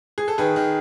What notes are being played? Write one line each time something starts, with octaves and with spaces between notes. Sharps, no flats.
G#4
A4
D#3 G#4 B4
D#3